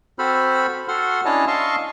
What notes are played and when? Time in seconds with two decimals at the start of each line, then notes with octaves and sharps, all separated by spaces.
0.19 C4 F#4 A4 C5 B5 F6
0.88 F#4 A4 F#5 C6 F6
1.25 C#4 D4 E4 C#5 D#5 A5
1.47 D#5 F5 A5 C6 C#6 E6